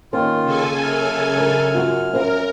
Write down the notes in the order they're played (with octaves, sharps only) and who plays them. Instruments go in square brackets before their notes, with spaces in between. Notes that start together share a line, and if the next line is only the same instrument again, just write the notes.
[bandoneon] D#3 F4 [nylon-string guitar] A#3 C#4
[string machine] C#3 A4 G#5
[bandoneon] F#2 F6
[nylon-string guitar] D4 A#4
F4 F#4
[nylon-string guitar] C#4 C5 F5 [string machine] A#4